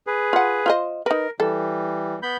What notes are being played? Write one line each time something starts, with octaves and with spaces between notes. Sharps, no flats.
G#4 B4
F4 F#5
F4 C5 D#5
D#4 A#4 B4
E3 G3 A4
B3 B5 G6